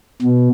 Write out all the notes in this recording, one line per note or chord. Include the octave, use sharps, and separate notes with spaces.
B2